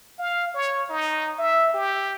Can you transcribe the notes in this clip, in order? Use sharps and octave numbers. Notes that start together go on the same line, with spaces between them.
F5
C#5
D#4
E5
G4